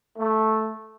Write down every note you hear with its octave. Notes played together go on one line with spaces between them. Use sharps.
A3